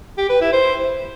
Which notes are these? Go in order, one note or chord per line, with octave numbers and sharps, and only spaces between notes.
G4
B4
E4
C5